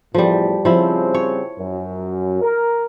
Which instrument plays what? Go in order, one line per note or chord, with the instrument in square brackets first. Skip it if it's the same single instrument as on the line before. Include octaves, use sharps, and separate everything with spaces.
[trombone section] E2 A2 [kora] F3 G3
[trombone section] C#3 G3 C4 [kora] F3 E4
[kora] C#5
[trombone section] F#2
A#4